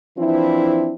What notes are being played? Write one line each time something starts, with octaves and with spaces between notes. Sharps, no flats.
E3 F3 C4 D4 E4